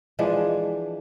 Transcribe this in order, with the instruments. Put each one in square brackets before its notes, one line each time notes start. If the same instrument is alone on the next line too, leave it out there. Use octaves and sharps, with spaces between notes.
[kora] E3 F3 G#3 D4